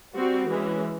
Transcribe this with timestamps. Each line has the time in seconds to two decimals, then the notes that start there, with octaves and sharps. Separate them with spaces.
0.15 G3 C4 F#4
0.48 E3 G#3 C#4